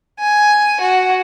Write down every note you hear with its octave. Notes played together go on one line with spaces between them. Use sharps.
G#5
F#4